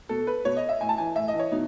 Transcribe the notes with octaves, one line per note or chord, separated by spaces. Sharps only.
B2 A4
B4
B2 C#5
D#5
E5
A2 G#5
A5
E3 G#5
A2 E5
D#5
E3
C#5
B2 D#4